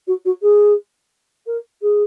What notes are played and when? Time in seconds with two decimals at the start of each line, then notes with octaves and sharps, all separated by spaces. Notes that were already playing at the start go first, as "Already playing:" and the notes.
0.07 F#4
0.25 F#4
0.42 G#4
1.46 A#4
1.82 G#4